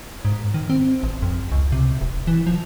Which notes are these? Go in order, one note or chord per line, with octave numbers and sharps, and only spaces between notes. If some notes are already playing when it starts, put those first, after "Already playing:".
G#2
D#3
C4
A1
F2
C#2
C3
E1
E3
F3